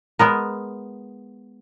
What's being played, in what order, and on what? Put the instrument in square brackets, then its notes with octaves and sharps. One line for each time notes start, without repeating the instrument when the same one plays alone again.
[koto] G#3 B3 A#4